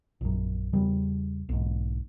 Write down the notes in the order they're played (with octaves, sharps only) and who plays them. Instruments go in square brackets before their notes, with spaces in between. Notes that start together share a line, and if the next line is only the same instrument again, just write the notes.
[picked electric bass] A#1 F#2
E2 C#3 G3
B1 G#2